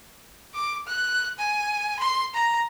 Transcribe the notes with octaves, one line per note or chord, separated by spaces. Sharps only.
D6
F#6
G#5
C6
A#5